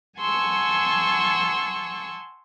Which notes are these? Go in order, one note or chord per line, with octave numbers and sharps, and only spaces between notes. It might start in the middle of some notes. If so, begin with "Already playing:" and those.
F#5 G#5 A5 C6 C#6 E6